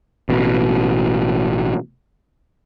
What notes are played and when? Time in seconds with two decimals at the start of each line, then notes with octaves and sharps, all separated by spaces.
0.29 A1 B2